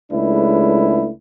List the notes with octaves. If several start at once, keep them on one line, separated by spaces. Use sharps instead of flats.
C#2 G#3 A3 D4 E4 B4